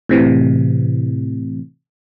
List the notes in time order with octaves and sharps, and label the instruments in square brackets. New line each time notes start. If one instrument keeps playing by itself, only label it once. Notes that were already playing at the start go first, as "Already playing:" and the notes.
[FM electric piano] A2 C3 E3